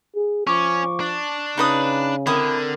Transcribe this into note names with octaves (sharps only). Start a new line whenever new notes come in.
G#4
F3 C#4 C#6 D6
D4
C#3 D#4 B4 D#6
D3 C4 E4 A#4 D#6